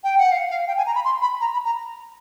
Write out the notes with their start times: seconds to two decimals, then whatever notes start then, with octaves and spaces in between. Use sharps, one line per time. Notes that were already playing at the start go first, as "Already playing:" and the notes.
0.04 G5
0.18 F#5
0.32 F5
0.51 F5
0.68 G5
0.77 G#5
0.87 A#5
0.95 B5
1.05 C6
1.22 B5
1.41 A#5
1.53 B5
1.65 A#5